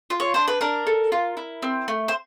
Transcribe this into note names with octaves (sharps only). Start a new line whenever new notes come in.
F4
C#5
D4 C5
B4
D4 A#4
A4
F4
E4
C4
A3
C5